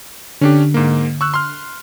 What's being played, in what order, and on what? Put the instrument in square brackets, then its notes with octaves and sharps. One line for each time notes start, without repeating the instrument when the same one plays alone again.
[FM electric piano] D3 [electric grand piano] C#4 D4 G4
[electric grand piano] G#2 A#3
C#6 E6 F#6
C6 F6